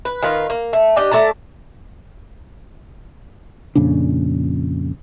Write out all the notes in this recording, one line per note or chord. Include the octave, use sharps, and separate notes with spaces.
B4
D#3 F4 B4
A#3
A3
D4 G4 D#5 G5
A3 D5 A5 A#5
F2 A#2 C#3 D4